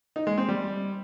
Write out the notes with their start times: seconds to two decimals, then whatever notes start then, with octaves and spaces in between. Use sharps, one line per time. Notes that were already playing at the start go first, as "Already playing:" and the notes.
0.16 D#4
0.27 G#3
0.38 C4
0.49 G3